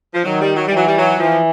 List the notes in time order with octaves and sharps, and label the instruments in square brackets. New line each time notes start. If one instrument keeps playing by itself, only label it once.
[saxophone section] F3
[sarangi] D#3 [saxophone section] F#3
[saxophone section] G3
F#3
G3
[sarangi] E3 [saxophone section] F#3
[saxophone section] G3
F#3
[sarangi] E3 [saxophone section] F3